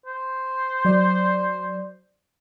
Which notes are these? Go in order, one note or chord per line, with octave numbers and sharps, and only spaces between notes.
C5
F#3 D5